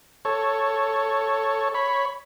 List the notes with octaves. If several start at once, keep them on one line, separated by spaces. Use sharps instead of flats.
A4 C#5
C#5 B5